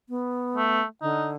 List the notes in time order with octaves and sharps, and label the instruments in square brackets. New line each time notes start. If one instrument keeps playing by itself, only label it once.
[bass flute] B3
[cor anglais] A3
[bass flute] D3 [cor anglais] D#4